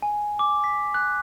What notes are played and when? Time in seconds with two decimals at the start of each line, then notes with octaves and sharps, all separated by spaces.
0.02 G#5
0.39 D6
0.64 B6
0.94 F#6